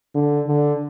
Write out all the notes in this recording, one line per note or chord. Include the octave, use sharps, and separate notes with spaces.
D3
D3